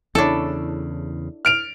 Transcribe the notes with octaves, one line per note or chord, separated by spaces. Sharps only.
E2 C#3 D4 E4 A4 C#5 B5
F6 D7 F7